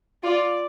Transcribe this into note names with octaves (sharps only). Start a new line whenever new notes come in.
F4 D5